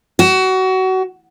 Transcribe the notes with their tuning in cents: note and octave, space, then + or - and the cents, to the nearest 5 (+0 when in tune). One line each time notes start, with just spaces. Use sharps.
F#4 +25